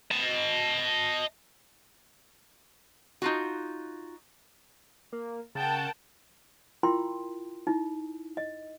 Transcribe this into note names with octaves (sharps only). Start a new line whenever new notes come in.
D#5 A5
D#4 F4 F#4
A#3
C#3 A#4 F#5 G5 A5
E4 F4 A#4 G5 A#5 C6
D#4 E4
D#5